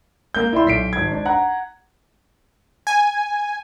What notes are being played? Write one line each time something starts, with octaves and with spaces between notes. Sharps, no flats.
A#3 G6
E4 D5 E5 C6
B1 B6 C7 D7
G#1 G#6
D4
F#5 A#5 F#6
G#5